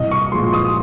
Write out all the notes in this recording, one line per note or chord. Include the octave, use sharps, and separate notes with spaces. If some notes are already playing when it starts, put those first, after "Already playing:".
Already playing: C2 D#5
C#6
A#2 F3 G#3 C6
D#6